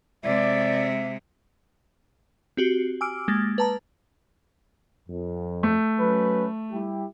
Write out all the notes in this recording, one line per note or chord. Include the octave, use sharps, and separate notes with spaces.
C3 G#3 D5 E5
C4 F#4 G4
G#5 D6 E6 F6 D7
G#3 A#3 A6
B4 A5 A#5
F2
A3
F#3 C#4 B4
G3 E4 G4